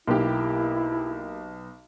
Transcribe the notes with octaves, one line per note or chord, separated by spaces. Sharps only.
B1 A#3 E4 G4